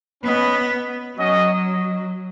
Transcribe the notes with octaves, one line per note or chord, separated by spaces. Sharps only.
B3 C#4 B4 D#5
F#3 C#4 F#4 D#5